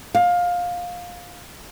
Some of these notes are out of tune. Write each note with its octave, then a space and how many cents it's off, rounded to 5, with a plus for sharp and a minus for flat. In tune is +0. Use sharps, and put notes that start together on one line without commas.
F5 +20